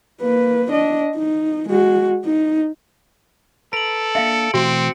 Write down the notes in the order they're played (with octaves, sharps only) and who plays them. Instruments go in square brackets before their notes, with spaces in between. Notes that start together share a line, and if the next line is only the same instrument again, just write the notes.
[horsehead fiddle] A#3 B4
D4 D#5
D#4
G#3 F#4
D#4
[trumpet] A4 [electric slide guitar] B4 A#5 [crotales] D7 F#7
[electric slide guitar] A#3 D4 [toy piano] E5 F5 [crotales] C#7
[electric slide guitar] B2 E3 A3 [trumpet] C4 [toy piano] F#4